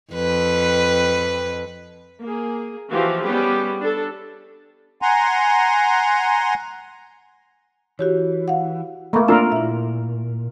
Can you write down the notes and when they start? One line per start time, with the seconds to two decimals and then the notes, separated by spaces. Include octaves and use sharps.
0.13 F2 B4
2.23 A#3 G#4
2.91 E3 F3 F#4 G4 F5
3.23 G3 B3 C#4 G4 G#4 B4
3.80 D4 A4
5.02 F#5 G#5 A#5 C6
7.99 E3 F#4 G4 C#5
8.48 F5 F#5
9.13 A3 A#3 A#5 B5 C#6
9.28 A#3 C4 D4 F4 A#4 A5 E6
9.52 A#2 E4 E5